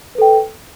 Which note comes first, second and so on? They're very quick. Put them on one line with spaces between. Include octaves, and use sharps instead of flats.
B4 A4 G5